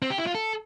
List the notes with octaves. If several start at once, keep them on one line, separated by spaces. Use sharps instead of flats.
C4
G4
E4
F4
A4